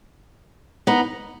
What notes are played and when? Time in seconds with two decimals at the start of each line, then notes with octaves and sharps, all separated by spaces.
0.87 B3 D#4